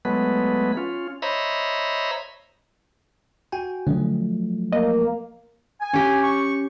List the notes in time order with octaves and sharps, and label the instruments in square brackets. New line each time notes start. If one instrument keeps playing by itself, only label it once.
[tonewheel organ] F#3 G#3 A3 B3 B4
C#4 F4
C5 C#5 D#5 E5 A#5 B5
[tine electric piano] F#4 G5 G#5
[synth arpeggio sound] D3 [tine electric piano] F3 F#3 A3
[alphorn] A#3 [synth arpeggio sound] D#5
[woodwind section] G#5
[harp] C#4 G4
[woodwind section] C#6